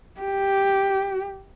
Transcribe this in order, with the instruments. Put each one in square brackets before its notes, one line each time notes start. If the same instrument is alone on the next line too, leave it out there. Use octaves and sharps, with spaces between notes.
[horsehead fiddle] G4